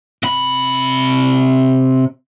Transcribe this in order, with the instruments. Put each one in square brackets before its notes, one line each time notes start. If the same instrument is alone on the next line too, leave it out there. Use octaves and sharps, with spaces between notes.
[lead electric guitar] C3 B5